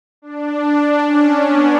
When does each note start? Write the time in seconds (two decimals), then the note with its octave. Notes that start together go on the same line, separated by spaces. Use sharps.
0.22 D4
1.05 C#4
1.47 B3